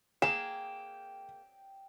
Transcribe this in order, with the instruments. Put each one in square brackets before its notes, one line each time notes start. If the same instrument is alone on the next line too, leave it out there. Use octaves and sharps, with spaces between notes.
[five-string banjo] A#3 G#4 [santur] G5 [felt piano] E7